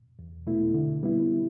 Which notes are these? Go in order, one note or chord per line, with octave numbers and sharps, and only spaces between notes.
E2
B2 A3 E4
D3
G3 B3 E4